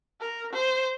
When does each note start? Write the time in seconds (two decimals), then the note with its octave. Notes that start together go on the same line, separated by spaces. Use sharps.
0.21 A#4
0.52 C5